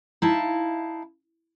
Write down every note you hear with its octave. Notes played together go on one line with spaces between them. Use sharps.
D#4 E4 F5 A5